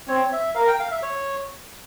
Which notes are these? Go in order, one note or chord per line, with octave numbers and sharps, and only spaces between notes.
C4 C#5
E5
A#4 F5
G5
F5
E5
C#5